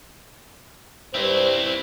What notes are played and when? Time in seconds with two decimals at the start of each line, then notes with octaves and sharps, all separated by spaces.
1.14 G2 C4 E4 C5